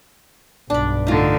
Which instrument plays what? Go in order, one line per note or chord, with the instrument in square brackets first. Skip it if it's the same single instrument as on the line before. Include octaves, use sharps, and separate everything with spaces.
[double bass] B1 G2 [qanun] D4 B5
[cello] A2 D3 [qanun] D#4 F4